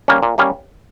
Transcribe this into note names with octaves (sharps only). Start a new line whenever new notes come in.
G3 A#3 C#4
A#2
G3 A#3 C#4